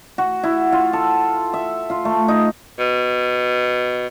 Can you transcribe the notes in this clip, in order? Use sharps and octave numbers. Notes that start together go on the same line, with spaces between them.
F#4
E4
F4
A4
E5
F4
A3
D#4
B2